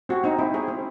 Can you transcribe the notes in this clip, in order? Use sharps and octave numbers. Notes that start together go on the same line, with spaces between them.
C4 F#4
C4 D#4
C4 E4
C4 G#4
C4